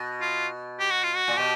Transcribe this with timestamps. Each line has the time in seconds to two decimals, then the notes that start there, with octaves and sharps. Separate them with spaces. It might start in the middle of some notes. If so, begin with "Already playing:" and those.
Already playing: B2
0.21 F4
0.79 G4
0.91 F#4
1.03 F4
1.15 F#4
1.28 A#2
1.38 B2 G4